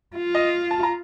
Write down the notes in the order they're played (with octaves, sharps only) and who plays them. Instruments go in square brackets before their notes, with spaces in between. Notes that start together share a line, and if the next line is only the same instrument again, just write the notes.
[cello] F4
[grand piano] D#5
A5
A#5